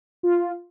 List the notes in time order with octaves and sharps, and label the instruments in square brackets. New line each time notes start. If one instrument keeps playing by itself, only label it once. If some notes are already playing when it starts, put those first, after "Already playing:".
[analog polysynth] F4